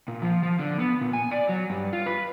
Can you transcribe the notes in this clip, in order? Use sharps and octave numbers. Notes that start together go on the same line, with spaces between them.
A#2
F3
F3
D3
B3
A#2
G#5
D5
F#3
G2
F4
B4